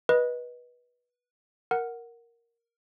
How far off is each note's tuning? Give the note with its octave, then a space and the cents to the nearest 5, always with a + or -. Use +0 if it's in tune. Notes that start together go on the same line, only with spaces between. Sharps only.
B4 -20 D#5 +0
A#4 +0 F#5 +0